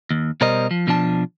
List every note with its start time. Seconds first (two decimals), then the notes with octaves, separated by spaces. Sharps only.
0.11 D#2
0.41 B2 G3 A#4 C5 D#5
0.71 F3
0.87 B2 F3 D4 A5